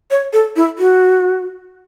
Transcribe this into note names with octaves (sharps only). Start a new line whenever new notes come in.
C#5
A4
E4
F#4